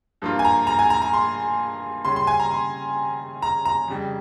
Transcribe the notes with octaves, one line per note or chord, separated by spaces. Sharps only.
G2 F3 A#3 F4
G#5
A#5
A#5
G#5
A#5
A#5
C6
C#3 G3 C#4 C6
C6
G#5
A#5
C6
A#5
A#5
F2 C#3 G3